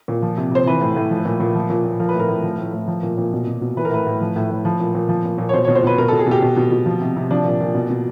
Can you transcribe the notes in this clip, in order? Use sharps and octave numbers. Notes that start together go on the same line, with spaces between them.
A#2
F3
C3
C3 C5
E3 B4
A2
A2
F3
A#2
A#2
F3
A#2
A#2
F3 A#4
B4
A2
A#4
A2
F3
A2
A2
F3
A#2
A#2
B2
B2
B2
E3 B4
A#4
A2 B4
A2
F3
A2
A2
F3
A#2
A#2
F3
A#2
A#2
C#5
B2 C5
B2 C#5
C5
B2 B4
B2 A#4
B2 A4
G#4
B2 G4
B2
B2
B2
F3
C3
C3
F3 D4
A#2
A#2
B2
B2